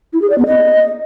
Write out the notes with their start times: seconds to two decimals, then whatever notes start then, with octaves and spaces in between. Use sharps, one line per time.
0.13 E4
0.22 G#4
0.30 D5
0.38 B3
0.46 D#5